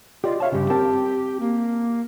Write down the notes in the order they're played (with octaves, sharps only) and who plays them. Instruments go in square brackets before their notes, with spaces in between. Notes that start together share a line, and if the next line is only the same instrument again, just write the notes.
[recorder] F4 [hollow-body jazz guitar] G4 D5 D#5
[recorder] C#5 [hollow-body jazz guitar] E5 F5 A5
[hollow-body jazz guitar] G2 C#3 [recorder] G4
[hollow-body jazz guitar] C4 A#4 A5
[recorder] A#3